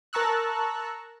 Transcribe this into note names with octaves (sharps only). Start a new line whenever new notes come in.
A#4 A5 A#5 C#6 E6 F#6